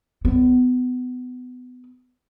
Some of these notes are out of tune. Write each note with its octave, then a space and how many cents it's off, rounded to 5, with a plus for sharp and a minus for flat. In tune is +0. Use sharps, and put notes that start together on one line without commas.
B3 +25